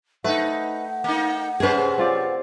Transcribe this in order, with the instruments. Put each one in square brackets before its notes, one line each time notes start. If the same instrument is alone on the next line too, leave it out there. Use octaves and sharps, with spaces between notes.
[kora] A3 [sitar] D#4 B4 [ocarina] F#5
[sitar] A#3 D#4
[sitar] C3 C#4 C5 [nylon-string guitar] G#4 B4
[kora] C4 F4 D5